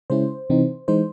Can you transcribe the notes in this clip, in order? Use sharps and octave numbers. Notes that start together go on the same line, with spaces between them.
C#3 G#3 C#4 E4 C5
C3 E3 C4 D#4
E3 G#3 D#4 C5